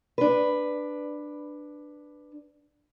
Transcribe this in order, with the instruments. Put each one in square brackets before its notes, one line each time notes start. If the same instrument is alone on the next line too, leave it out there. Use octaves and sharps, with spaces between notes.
[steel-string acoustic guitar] D4 B4